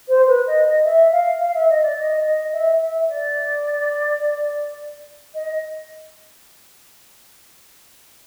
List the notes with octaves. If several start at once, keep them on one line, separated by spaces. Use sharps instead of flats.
C5
B4
D#5
D#5
E5
F5
F5
E5
D#5
D5
D#5
D#5
E5
E5
D5
D#5